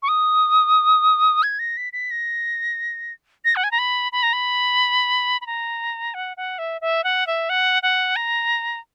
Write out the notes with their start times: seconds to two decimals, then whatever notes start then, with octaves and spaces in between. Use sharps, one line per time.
0.03 C#6
0.08 D#6
1.43 G#6
1.59 A#6
1.77 B6
1.93 B6
2.11 A#6
3.45 A#6
3.56 F#5
3.64 G#5
3.71 A#5
3.79 B5
4.12 B5
4.23 A#5
4.33 B5
5.41 B5
5.47 A#5
6.14 F#5
6.37 F#5
6.59 E5
6.81 E5
7.04 F#5
7.27 E5
7.49 F#5
7.83 F#5
8.16 A#5